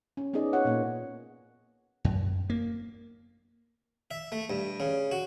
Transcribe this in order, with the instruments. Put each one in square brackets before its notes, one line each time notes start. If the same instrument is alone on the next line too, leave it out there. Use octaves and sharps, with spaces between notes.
[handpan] C#4
B3 C#4 D#4 G#4 D5 D#5
C#4 F4 C#5 F#5
A#2 A#3
[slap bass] F#2
A#3
[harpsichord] E5
A3
G2
C#3
F#4